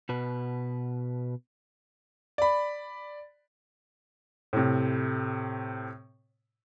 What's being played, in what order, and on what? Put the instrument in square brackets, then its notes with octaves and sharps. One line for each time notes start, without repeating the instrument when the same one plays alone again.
[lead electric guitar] B2 B4
[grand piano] D5 B5
[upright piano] A2 C3